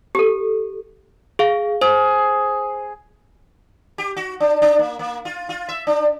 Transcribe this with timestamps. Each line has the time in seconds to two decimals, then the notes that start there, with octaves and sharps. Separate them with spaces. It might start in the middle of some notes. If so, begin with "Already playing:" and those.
0.15 G4 A4
1.39 G#4 F5
1.81 G#4 C5
3.98 G4
4.17 F#4
4.40 D4
4.62 D4
4.79 A#3
4.99 A#3
5.25 F4
5.49 F4
5.69 E5
5.87 D4